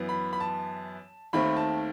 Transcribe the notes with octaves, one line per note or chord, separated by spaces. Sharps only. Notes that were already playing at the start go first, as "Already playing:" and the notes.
Already playing: F#2 E3 B3
B5
B5
A5
D#2 D#3 A3 C4 B5
A5